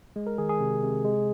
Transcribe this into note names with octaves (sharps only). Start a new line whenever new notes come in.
G#3
A#4
D#3 G#4
G#4
C3
C3
G#3